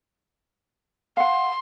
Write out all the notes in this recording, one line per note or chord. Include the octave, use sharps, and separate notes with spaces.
F5 F#5 C6